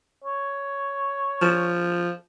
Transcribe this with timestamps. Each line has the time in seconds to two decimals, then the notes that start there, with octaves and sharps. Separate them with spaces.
0.24 C#5
1.41 F3